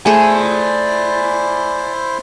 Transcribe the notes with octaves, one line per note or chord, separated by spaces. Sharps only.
A3 E4 G#4 C5 D5 G#5